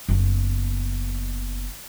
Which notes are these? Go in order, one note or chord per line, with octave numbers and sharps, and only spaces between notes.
F#1 B3